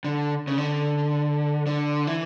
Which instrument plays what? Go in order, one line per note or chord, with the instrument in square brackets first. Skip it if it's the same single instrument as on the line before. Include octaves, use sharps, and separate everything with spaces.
[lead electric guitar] D3
C#3
D3
D3
E3